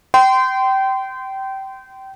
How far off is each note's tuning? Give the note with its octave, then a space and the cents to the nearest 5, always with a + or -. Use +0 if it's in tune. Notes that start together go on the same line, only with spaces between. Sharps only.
G5 -25 C6 -25